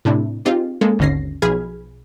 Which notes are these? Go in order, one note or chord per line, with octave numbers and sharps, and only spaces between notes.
A2 C3 D4 E4
C4 D#4 F4 G4 G#4
G#3 A#3 C#4 A4
G#1 D#2 D3 C#4 A#6 C7
B1 F3 G#4 B5 F6 G#6